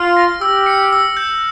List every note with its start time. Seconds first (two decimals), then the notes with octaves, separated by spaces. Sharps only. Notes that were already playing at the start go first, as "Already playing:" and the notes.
Already playing: F4 F6
0.17 A#6
0.41 G4 E6
0.66 C#7
0.93 E6
1.17 G6